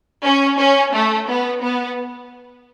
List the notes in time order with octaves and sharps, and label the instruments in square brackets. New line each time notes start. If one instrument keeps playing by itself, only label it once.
[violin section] C#4
C#4
A3
B3
B3